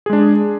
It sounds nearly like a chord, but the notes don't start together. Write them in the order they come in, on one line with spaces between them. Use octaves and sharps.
G#4 G#3 D4